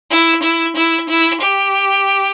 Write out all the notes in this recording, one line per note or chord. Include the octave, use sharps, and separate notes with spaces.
E4
E4
E4
E4
G4